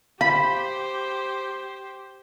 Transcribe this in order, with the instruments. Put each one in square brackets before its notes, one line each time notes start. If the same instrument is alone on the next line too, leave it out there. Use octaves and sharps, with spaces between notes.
[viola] G4 C5 [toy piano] F5 [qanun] B5